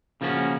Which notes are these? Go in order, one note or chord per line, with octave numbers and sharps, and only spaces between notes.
C#3 F3 A#3 C#4 F#4